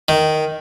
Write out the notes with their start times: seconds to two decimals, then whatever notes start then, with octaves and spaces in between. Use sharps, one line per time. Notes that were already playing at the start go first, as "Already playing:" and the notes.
0.08 D#3